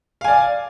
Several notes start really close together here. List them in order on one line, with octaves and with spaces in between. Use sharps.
F5 G#5 D5